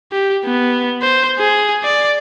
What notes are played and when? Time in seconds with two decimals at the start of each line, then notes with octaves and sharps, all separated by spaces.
0.12 G4
0.45 B3
1.02 C5
1.38 G#4
1.84 D5